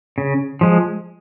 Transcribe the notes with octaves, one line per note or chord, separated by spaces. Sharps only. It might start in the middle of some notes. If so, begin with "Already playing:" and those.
C#3
F3 G#3